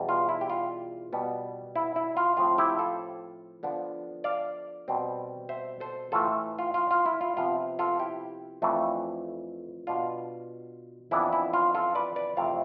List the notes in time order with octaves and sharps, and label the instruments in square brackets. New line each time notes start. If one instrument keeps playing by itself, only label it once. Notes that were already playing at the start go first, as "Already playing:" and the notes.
Already playing: [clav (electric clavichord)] E2 B2 G3
F4
E4
G4
F4
B2 G3 B3
E4
E4
F4
A2 F3 C4 F4
E4 G4
F4 A4
D3 F3 B3 D4
D5 F5
B2 G3 C4
C5 E5
A4 C5
A2 E3 A3 F4 A4
F4
F4
F4
E4
F4
C3 F3 B3 F4
F4 A4
E4 G4
F2 E3 A3 D4
B2 B3 D4 F4
F2 E3 B3 D4 E4
E4
F4
F4 A4
B4 D5
B4 D5
F2 C3 E3 A3 C4 D5 F5